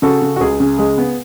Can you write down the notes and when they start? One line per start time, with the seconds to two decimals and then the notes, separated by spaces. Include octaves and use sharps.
0.02 C#3 F#4 A4
0.22 C#3
0.36 F#4
0.40 C#2 G#4
0.60 C#3
0.78 G#3 G#4
0.98 B3